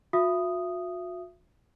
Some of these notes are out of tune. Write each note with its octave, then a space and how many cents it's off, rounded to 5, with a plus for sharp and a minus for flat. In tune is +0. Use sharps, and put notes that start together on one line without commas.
F#4 -45 E5 +30 D#6 -5